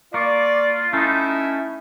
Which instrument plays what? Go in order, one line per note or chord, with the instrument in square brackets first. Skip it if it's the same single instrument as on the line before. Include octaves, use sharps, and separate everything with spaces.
[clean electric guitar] A#3 [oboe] F4 [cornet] D5 [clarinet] C#6
[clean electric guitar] A3 D#4 [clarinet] C#4 [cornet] E4